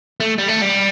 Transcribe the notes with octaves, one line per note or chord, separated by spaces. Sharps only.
A3
G3
A3
G3